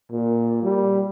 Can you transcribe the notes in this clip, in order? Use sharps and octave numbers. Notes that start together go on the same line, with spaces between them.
A#2
G3